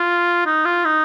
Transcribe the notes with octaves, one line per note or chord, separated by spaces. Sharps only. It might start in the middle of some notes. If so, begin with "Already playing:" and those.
Already playing: F4
D#4
F4
D#4